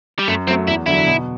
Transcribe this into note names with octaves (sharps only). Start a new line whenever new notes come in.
G3
F#2 A3
F#3 A3 C4
E2 E4
D3 F#3 E4
B2